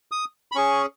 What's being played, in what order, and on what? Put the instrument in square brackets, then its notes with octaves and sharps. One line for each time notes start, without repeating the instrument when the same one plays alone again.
[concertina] D#6
B5
C#4 G#4 C#6